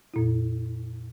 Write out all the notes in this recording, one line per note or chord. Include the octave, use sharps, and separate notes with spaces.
F2 A#2 E4